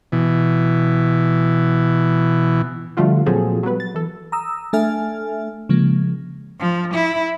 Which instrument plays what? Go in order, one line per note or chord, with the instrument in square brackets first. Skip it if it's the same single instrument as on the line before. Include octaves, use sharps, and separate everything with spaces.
[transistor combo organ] B2 E3
[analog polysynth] D3 F3 G3 A3 F4 F#4
A#2 F3 F#3 C4 G#4 A4
F#3 G3 B3 B4
A6
E3 A4
[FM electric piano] A#5 D#6 E6
A3 D4 A4 E5 G#5 F6
C#3 F3 G#3 A#3
[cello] F3
E4